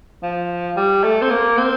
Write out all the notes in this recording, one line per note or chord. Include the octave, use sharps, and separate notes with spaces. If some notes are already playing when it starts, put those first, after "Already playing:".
F3
G3
A3
C4
A#3
C4